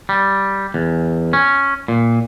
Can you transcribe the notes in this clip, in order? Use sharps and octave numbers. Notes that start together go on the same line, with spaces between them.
G3
E2
C#4
A#2